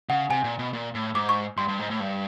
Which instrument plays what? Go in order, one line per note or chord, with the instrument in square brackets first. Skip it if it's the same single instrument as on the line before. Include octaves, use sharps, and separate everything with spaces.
[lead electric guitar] C#3 [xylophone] F#5
[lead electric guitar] C3 [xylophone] G#5
[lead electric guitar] A#2
B2
A#2
A2
[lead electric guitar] G#2 [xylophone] D6
[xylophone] C#6
[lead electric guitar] G2 [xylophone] C6
[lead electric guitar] G2
G#2
A2
G2